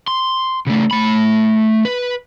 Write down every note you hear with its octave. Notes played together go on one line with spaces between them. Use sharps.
C6
C#3 A3
A3 B5
B4